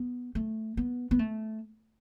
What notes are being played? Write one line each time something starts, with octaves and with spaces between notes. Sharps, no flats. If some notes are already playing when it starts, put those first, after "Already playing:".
Already playing: B3
A3
B3
B3
A3